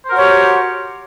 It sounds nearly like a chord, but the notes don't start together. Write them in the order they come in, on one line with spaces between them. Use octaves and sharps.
C5 A#4 F#4 C#5 G4